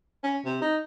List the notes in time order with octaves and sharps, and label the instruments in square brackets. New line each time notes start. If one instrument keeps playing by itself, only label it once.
[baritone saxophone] C#4
C3
D#4